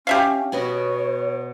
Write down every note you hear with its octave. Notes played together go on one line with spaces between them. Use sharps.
C#4 G4 E5 F5
B2 B3 C#5 D#5